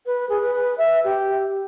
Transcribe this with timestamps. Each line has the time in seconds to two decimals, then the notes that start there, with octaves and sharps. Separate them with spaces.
0.06 B4
0.29 G#4
0.42 B4
0.78 E5
1.04 G4